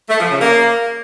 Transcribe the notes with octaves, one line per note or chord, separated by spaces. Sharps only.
A3
F3
C#3
A#3